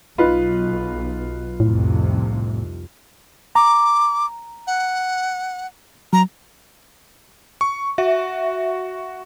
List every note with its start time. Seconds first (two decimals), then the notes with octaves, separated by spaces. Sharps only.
0.18 B1 D#4 F4 B4
1.60 C2 F2 A2 C3
3.55 A#5 D6
4.67 F#5
6.13 F#3 A#5
7.61 C#6
7.98 F#4 E5